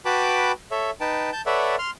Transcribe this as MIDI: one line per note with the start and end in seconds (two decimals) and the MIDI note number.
0.05 0.52 66
0.05 0.52 71
0.05 0.52 79
0.05 0.52 81
0.05 0.52 83
0.05 0.52 86
0.71 0.91 69
0.71 0.91 73
0.71 0.91 76
1.01 1.30 63
1.01 1.30 71
1.01 1.30 79
1.01 1.30 81
1.32 1.42 81
1.32 1.42 91
1.46 1.76 69
1.46 1.76 71
1.46 1.76 73
1.46 1.76 74
1.46 1.76 76
1.46 1.76 78
1.79 1.91 84
1.79 1.91 89